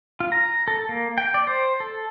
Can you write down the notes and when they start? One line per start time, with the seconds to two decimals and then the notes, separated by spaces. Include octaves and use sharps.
0.20 F4
0.32 A#5
0.68 A4
0.89 A#3
1.18 G5
1.34 D5
1.47 C5
1.80 A4